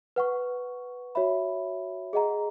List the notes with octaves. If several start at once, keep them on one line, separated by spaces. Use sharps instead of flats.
B4 F#5 C#6
F#4 C#5 E5 B5
G#4 D#5 F#5 A#5